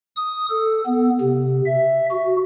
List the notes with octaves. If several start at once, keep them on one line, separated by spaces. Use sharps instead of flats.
D#6
A4
B3
C3
E5
F#4